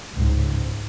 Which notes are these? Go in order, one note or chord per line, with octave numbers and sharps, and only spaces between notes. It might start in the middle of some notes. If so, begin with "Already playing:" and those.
C#2 G#2